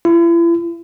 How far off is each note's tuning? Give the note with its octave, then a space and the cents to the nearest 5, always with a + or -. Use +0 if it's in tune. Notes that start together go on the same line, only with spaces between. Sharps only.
E4 +40